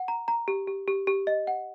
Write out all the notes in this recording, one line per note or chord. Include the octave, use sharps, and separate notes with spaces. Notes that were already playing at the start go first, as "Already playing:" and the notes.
Already playing: F#5
A#5
A#5
G4
G4
G4
G4
D#5
F#5